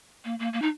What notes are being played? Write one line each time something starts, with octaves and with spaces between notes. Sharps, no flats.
A#3
A#3
A#3
D#4